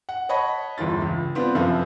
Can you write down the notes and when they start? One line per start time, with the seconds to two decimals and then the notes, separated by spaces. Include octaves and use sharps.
0.09 F#5
0.29 C#5 D#5 F#5 A5 B5 C#6
0.78 G1 E2 E3 F4 A6
1.02 C#2
1.35 B3 C4 D4 F4 B4
1.55 F#2 C3 F3 A4 B4 F5